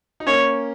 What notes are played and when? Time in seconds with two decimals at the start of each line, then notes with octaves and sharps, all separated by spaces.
0.20 D#4
0.27 A#3 C#4 C#5